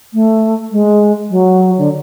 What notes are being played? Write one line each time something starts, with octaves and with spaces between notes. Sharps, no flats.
A3
G#3
F#3
D3